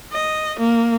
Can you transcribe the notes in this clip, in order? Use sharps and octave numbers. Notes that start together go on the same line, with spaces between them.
D#5
A#3